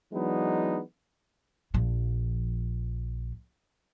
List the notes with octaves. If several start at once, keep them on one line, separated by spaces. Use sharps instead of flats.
E3 F#3 G#3 B3 D4 D#4
A#1 F3